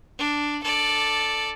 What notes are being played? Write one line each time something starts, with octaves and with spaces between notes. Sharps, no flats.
D4
A4 D5